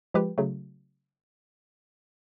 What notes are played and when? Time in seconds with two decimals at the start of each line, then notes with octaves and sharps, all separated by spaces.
0.14 F3 G#3 G4 B4
0.38 C#3 F#3 A3